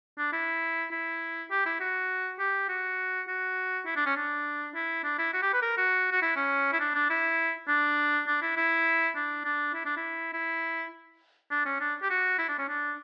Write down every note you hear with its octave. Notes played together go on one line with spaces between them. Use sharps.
D4
E4
E4
G4
E4
F#4
G4
F#4
F#4
E4
D4
C#4
D4
E4
D4
E4
F#4
G4
B4
A#4
F#4
F#4
E4
C#4
E4
D4
D4
E4
D4
D4
E4
E4
D4
D4
E4
D4
E4
E4
D4
C#4
D4
G4
F#4
E4
D4
C#4
D4